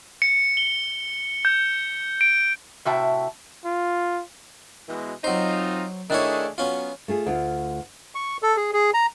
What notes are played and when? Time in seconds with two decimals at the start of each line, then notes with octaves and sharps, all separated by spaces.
0.22 C#7
0.57 G7
1.45 G6
2.21 D7
2.85 A2 C3 F#4 E5 G5 A5
3.65 F4
4.89 B2 E3 G#3
5.24 F#3 C4 D#4 F4 C5
6.10 D#3 A3 D4 E4 G#4 C#5
6.58 F#3 B3 C#4 F4
7.08 A3 F4 G#4
7.26 D2 F4
8.15 C#6
8.43 A4
8.57 G#4
8.73 G#4
8.94 A#5